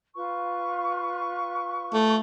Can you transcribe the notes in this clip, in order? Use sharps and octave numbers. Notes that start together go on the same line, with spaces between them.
F4 B4 C#6
A3